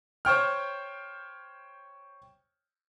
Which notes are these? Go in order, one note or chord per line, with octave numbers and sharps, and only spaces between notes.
C5 C#5 G5 F6